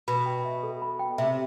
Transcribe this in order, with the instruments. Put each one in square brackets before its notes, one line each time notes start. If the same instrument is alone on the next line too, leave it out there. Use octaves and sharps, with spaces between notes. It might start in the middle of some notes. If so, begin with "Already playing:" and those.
[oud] B2 [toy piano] B5
[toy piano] G5
E5
A4
B5
G5
[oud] C3 [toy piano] E5